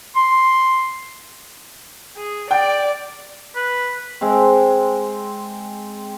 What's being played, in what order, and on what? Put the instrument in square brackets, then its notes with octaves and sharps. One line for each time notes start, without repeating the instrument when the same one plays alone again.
[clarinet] C6
[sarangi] G#4
[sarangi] D5 [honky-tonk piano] G5
[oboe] B4
[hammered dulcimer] G#3 C4